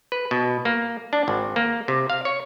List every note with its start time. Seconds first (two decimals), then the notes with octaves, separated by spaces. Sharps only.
0.12 B4
0.31 B2
0.65 A#3
1.13 D4
1.28 G#1
1.56 A#3
1.88 C3
2.10 F5
2.25 C#5